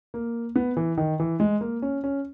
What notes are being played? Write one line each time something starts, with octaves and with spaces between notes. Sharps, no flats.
A#3
B3
E3
D#3
E3
G#3
A#3
C#4
C#4